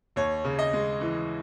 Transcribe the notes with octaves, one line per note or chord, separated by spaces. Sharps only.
D#2 C#5
C#3
D#5
G#3
E3